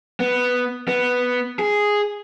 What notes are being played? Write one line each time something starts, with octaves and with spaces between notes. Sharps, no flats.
B3
B3
G#4